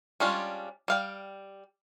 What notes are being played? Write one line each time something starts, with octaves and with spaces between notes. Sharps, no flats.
G3 G#3 C#4 D4 F4
G3 F5 G5